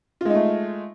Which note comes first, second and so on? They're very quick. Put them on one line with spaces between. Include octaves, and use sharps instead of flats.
F4 G#3 D#4 A3